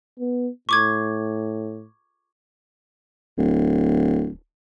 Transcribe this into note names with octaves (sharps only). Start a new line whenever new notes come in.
B3
A2 C#6 D6 G#6
D1